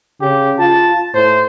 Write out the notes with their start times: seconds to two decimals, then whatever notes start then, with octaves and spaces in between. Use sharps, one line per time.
0.21 C#3 G4
0.59 F4 A5
1.14 A2 C5